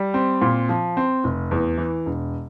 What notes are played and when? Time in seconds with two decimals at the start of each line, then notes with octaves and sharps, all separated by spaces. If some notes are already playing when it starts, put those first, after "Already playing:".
Already playing: G3
0.14 C4
0.42 A#2
0.69 F3
0.97 C4
1.24 F1
1.51 E2
1.78 E3
2.06 E1